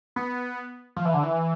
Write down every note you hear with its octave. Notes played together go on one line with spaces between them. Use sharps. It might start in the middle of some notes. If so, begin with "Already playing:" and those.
B3
F3
E3
D3
E3